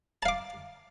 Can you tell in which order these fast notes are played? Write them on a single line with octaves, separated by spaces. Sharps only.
A5 F5 D6